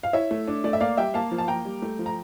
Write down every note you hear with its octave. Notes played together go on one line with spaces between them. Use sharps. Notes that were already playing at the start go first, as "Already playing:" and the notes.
F5
E4 C#5 E5
A3
D4
A3 D5
E5
A#3 D5 F5
G3 E5 G5
A#3 F5 A5
F3
A5
A#3 G5 A#5
G3
A3
F3
A#5